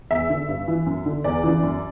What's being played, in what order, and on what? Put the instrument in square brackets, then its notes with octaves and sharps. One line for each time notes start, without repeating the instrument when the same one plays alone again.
[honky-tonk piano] E2 E5
D3
G2
E3
F#2
D3
E2 D5
C#3 E3
F#2